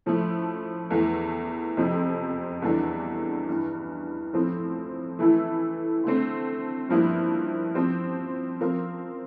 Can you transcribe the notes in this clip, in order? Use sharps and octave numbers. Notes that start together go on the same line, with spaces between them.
A2 F3 A3
E2 E3 A3
F2 C3 F3
E2 E3 G3 D4 A4
G2 E3 G3
A2 F3 C4
E3 A3 E4 A4
D3 A3 C4
G2 F3 A#3 E4 G4
F3 C4 G4
F3 C4 F4 A#4